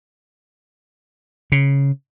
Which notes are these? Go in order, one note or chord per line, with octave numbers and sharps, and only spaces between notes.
C#3